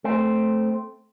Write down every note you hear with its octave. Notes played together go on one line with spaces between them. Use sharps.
A3 C4